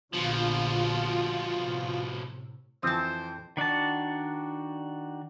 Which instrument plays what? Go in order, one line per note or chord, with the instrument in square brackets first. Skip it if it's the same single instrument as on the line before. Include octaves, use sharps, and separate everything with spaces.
[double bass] A#1 D3 [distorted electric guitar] B2 F3 [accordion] F4
[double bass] A2 C3
[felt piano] F2 E3 F3 [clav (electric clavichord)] C4 [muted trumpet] C5 [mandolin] A5 D#6
[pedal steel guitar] D#3 D4 F#4 A5